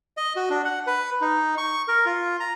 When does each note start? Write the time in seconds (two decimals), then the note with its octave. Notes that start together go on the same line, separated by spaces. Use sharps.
0.17 D#5
0.36 F#4
0.50 D4
0.65 F#5
0.87 B4
1.21 D#4
1.58 C#6
1.88 A#4
2.06 F4
2.40 A#5